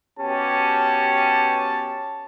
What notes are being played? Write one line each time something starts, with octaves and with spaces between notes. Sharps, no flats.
B2 C#4 G4 A5